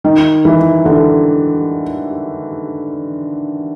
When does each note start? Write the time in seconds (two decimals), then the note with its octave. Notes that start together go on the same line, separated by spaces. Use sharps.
0.04 D#3
0.45 E3
0.85 D3